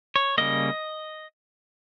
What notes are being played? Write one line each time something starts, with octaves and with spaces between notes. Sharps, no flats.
C#5
C#3 G3 A#3 D#5